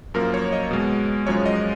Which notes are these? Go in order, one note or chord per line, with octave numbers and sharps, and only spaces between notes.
F#2 F3 A#3 A#4
C#5
D#5
B2 G#3
F#2 F3 G#3 C#5
D#5